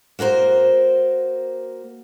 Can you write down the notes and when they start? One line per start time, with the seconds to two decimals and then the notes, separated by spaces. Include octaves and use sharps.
0.19 A#3 F#4 A#4 C5